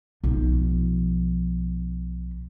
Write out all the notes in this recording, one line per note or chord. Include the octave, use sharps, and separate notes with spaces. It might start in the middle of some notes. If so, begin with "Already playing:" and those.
B1 F3